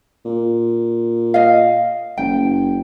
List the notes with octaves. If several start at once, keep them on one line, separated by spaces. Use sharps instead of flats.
A#2
D#5 F5
F#1 G5